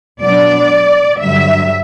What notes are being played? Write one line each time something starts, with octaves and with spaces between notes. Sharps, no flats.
B2 F#3 B3 D4 D5
G2 D3 F#3 E5